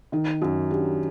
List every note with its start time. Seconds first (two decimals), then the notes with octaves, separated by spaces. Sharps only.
0.12 D#3 D#4
0.41 F#2 F#4
0.71 D4 G4